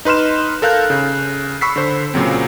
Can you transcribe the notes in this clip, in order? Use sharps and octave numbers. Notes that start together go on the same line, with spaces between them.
D#4 B4 C6 F6 E7
A4 A#4 F5 F#6 G6
C#3
B5 C#6 E6 B6 C7
D3 C5
A#2 C#3 F#3 C4